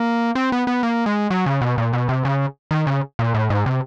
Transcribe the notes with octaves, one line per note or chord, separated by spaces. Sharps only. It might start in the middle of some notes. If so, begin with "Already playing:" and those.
Already playing: A#3
C4
B3
B3
A#3
G#3
F#3
C#3
B2
A#2
B2
C3
C#3
D#3
C#3
A#2
A2
G#2
C3